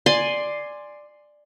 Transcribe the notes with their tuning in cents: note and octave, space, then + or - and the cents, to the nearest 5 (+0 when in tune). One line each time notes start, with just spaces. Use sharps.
D5 +10 G#5 +0 C6 +0